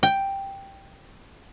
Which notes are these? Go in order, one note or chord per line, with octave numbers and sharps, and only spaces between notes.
G5